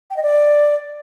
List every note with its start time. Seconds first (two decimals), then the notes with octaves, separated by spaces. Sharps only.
0.10 G5
0.17 D#5
0.23 D5